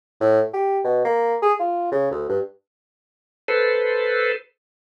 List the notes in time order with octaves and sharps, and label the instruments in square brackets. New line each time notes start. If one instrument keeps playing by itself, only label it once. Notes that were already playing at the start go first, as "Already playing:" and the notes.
[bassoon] A2
G4
B2
A#3
G#4
F4
C#3
D2
G2
[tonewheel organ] A4 B4 C5